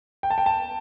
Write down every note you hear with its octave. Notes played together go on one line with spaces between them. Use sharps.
G5
A5
G5
A5